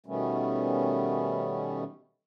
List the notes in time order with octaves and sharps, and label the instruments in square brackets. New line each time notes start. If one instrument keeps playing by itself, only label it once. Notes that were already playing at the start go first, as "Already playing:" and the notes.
[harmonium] B2 D#3 G3 A3 B3 C#4